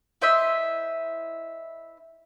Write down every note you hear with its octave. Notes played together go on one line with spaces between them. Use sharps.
E4 C5 D#5 E5